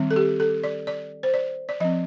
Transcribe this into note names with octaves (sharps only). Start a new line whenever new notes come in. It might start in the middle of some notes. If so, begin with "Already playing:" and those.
Already playing: D#3 G3 C4
A4
G4
A4
D5
D5
C5
D5
D5
F3 C4 D#5